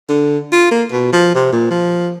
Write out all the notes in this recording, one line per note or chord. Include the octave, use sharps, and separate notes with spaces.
D3
F4
A#3
B2
F3
C3
A#2
F3